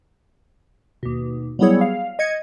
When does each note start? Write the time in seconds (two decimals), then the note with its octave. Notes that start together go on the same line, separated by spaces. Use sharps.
1.03 D#2 B2
1.59 F#3 G3 B3 E4 G#4 C#5
1.81 F5
2.19 D#5 G#6 C#7